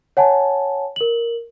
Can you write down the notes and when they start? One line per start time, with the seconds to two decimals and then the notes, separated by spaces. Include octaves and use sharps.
0.17 C#5 F#5 G#5 A5
0.96 A#4 F#7